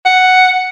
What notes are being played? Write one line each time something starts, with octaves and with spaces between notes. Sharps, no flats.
F#5